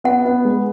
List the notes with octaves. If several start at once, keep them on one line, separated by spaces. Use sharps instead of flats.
B3 F#5
B3
G#3